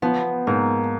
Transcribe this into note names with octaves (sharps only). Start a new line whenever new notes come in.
F3 B3
G#2 A#3